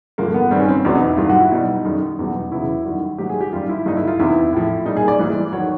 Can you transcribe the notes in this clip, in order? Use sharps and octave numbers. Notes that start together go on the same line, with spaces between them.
G2 D3 F3 A#3
B3
G2 D#3 G3 C4
C#4
C4
E2 B2 F#3 D4
D#4
E4
G2 D#3 F#3 F4
F#4
E4
B2 G3 D#4
F#2 D#3 G3
E2 B2 G3
E2 C#3 F#3 E4
F#2 D#3 G3 F#4
G#2 D#3 F#3 G4
G#4
G4
F#2 D#3 G3 F4
E4
G2 D3 G3 D#4
E4
F4
E2 C3 D#3 E4
A2 F3
A#2 G3 D#4
G#4
D5
G#2 E3 G3
D#3 F#3 C#5